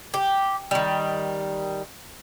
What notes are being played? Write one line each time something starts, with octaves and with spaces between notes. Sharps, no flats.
G4
D#3 G3